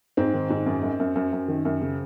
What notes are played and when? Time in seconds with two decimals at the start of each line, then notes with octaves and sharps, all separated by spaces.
0.17 G#2 C4
0.34 D#3
0.50 G#2
0.66 F#2
0.83 F#2
1.00 F#2
1.16 F#2
1.33 F#2
1.48 D#3
1.65 F#2
1.81 C#3